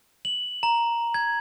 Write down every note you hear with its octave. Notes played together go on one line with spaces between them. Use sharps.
F#7
A#5
G#6